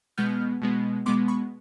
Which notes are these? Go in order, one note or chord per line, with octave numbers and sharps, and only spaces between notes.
B2 G#3 B3 F6 G6
B2 G#3 B3
B2 G#3 B3 C6 D6
B5 C#6